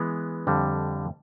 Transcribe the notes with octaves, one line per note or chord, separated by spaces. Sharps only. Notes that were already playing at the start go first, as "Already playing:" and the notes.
Already playing: E3 G#3 B3
F2 D3 G3